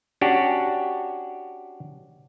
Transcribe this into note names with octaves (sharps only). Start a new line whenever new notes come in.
C#4 D4 F#4 G4